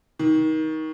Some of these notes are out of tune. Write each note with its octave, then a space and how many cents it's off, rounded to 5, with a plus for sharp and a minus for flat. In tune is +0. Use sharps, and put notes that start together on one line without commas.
D#3 +20